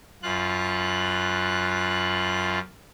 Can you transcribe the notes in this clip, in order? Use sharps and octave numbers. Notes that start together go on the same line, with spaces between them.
F#2 F4 F#6